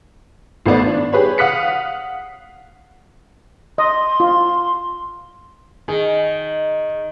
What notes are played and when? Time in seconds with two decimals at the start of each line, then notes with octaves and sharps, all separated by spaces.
0.66 G#1 A3 B3 D5
0.86 D4
1.13 G4 G#4 B4 C#5
1.38 F5 F#5 D#6 F#6 B6 C#7
3.78 D#5 C6
4.20 F4
5.88 D#3 G#4